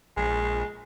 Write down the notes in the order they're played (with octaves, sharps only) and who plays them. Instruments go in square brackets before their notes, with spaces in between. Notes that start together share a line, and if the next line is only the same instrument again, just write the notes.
[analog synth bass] A#1 [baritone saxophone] G#3